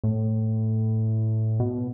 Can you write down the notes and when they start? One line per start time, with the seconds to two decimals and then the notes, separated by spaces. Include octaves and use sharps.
0.04 A2
1.60 B2